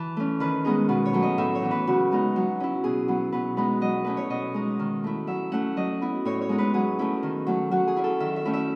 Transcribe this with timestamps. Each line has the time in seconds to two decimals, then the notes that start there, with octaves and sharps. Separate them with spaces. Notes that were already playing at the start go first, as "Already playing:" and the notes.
Already playing: E3 A5
0.17 A3 C#4
0.40 D#3 B4
0.65 G#3 B3 D#4 G#4
0.89 B2 B4
1.05 C#5
1.13 F#3 A3
1.22 D#5
1.38 A2 E5
1.55 C#5
1.62 E3 B3
1.71 B4
1.87 C#3 F#4
2.11 G#3 B3 D#4
2.36 F#3
2.60 C#4 E4
2.84 B2 G#4
3.08 F#3 B3
3.32 B2 B4
3.57 G#3 B3 D#4 B4
3.81 F#3 D#5
4.05 A3 C#4 E4 B4
4.17 C#5
4.30 B2 D#5
4.54 G#3 D#4
4.79 D#3
5.04 A3 E4
5.27 F#3 E5
5.52 A3 C#4 F#5
5.77 F#3 D#5
6.01 B3 E4
6.25 A2 C#5
6.42 C#5
6.49 G#3 B3 D#4
6.58 B4
6.74 F#3 G#4
6.99 A3 C#4 E4
7.23 D#3
7.47 F#3 A3
7.71 F#3 F#4
7.87 G#4
7.96 C#4 E4
8.04 A4
8.20 D#3 E5
8.36 E5
8.45 A3 C#4 E4
8.53 E5